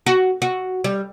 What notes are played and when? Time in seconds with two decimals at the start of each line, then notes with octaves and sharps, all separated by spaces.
0.06 F#4
0.42 F#4
0.84 G3